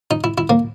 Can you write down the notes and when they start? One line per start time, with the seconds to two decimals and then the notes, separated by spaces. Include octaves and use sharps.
0.11 D#4
0.24 E4
0.38 E4
0.50 A#3